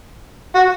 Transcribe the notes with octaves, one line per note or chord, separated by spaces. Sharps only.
F#4